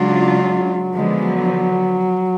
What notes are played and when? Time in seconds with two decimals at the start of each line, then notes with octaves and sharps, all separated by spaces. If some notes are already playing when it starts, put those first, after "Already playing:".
Already playing: C#3 F#3 G#3 D4 F4
0.94 D3 F3 G#3 B3
1.22 F#3